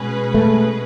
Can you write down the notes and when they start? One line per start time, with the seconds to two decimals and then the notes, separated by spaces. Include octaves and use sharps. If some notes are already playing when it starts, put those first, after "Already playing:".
Already playing: B2 G#3 C#4 G#4 B4
0.34 A3